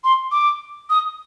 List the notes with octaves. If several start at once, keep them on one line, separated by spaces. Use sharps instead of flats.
C6
D6
D#6